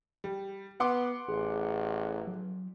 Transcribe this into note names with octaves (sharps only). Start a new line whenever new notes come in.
G3
B3 F#5 C6 D6
A1 G#4
F#3